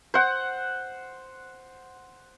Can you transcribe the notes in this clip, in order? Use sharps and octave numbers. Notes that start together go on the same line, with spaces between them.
C5 F#5